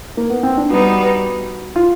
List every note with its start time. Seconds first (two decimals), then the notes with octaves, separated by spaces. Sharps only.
0.17 A#3
0.30 B3
0.43 C4
0.57 D4
0.70 G3 B3 D#4 F#4
1.76 F4